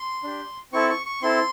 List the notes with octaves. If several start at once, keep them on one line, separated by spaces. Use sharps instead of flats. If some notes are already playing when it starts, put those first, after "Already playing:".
Already playing: C6
D4 G4
C4 E4 A4 C#6
C#6
C#6
C4 E4 A4 C6